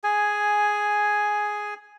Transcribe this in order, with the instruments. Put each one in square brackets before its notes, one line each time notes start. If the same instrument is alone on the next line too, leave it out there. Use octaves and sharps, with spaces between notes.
[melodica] G#4 G#5